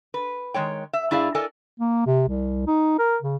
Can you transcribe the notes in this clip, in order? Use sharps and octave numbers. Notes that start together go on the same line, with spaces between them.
B4
D#3 G#3 C#5 G5
E5
G2 E4 G#4 D5 F5
A4 A#4 D5 D#5 G#5
A#3
C3
C2
D#4
A#4
C#3